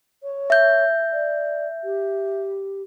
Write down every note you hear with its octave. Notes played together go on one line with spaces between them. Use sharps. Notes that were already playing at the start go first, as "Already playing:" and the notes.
C#5
E5 G6
D5
G4